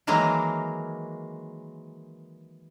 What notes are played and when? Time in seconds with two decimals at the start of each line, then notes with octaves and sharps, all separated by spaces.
0.07 D#3 E3 F#3 G#3 A#3